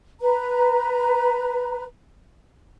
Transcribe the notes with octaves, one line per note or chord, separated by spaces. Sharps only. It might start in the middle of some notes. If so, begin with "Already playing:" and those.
B4 A#5